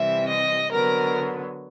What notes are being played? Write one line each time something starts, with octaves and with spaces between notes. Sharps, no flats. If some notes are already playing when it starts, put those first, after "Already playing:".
Already playing: C3 E3 G3 C4 E5
D#5
D3 F#3 B3 A#4